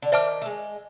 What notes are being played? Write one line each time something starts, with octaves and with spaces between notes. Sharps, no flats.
D3
D#3 C5 E5 A5 D6 F6
A3
G#3